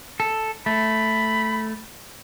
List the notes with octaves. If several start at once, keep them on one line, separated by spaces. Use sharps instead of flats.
A4
A3 B5